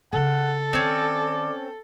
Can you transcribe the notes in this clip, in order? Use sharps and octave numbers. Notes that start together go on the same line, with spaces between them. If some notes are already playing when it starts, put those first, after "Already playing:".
C#3 C4 A4 F#5
D#3 C4 C#4 D5